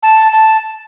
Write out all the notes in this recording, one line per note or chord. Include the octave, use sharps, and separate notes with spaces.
A5
A5